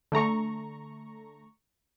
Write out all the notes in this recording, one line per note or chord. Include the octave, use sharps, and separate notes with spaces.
D3 A3 A#5 C#6